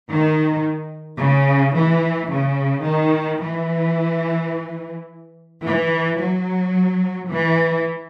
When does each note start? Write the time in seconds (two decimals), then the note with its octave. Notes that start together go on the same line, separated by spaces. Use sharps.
0.10 D#3
1.20 C#3
1.75 E3
2.31 C#3
2.87 D#3
3.41 E3
5.63 E3
6.18 F#3
7.29 E3